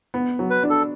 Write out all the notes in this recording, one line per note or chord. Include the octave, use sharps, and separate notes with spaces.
B3
F#3
B4
D4
A4